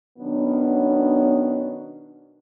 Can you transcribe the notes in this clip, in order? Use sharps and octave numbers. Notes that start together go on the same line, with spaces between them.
B2 D#3 F#3 B3 C#4 D4